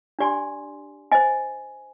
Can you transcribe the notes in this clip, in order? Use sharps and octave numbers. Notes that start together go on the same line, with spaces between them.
D4 G4 D5 G#5 C6
C5 D#5 G#5